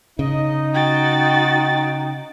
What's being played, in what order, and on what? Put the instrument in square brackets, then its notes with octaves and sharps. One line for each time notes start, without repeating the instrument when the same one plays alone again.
[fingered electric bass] C#3 [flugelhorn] D#4 [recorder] D#5
[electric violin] F#4 A6 [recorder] G5